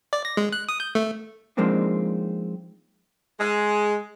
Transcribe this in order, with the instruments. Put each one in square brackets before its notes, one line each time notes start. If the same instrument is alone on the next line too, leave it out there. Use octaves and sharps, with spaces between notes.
[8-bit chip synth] D5
A#6
G#3
F#6
D#6
G6
A3
[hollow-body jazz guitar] F3 G#3 A#3 C4 D4 D#4
[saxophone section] G#3